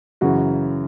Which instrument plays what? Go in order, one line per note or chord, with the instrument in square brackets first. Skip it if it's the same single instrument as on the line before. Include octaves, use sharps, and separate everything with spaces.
[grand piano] F#2 C#3 E3 F#4